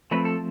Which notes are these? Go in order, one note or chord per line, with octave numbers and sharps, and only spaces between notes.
F3 A3 C4 B4
A4